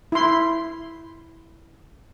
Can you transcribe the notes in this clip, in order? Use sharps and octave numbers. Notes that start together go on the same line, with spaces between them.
E4 C6